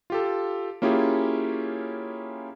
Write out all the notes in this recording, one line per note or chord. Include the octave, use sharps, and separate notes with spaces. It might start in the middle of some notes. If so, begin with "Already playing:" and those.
F4 G4 A4
A#3 C#4 E4 F4 G4 G#4